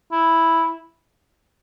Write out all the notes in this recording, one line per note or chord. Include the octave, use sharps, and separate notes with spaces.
E4